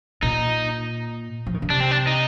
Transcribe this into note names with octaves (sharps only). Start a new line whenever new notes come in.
A#2 D#4
F3
D#3
D3
C3 D4
C4
D4
D#4